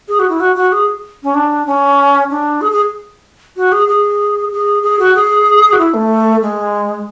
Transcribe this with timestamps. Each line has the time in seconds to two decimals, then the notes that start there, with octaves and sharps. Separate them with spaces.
0.08 G#4
0.19 F#4
0.29 E4
0.40 F#4
0.56 F#4
0.72 G#4
1.23 C#4
1.35 D4
1.67 C#4
2.30 D4
2.61 G#4
2.72 G#4
3.56 F#4
3.72 G#4
3.88 G#4
4.52 G#4
4.83 G#4
4.99 F#4
5.15 G#4
5.73 F#4
5.78 E4
5.94 A3
6.42 G#3